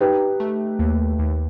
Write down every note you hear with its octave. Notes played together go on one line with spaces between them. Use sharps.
D#4 G4 B4
A3
D#2
D#2